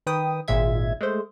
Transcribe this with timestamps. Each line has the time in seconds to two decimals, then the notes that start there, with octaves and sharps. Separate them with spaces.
0.06 D#3 B4 G5 D#6
0.48 G#1 A#2 G#3 E5 G#6
1.01 G#3 A3 C5